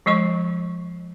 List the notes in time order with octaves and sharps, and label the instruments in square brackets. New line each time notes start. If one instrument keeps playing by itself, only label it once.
[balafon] F3 G#3 D#5 C#6